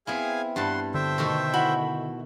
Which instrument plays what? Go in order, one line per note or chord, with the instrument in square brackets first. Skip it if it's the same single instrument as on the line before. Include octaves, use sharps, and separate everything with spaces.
[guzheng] B3 C4 E4 [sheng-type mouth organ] G#4 F5 G#5
[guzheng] G2 G3 A5 [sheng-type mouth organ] F#5 C6
[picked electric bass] D3 [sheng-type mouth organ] C5 E5 G5
[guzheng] B2 D#3 A3
[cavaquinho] E4 F#4 B5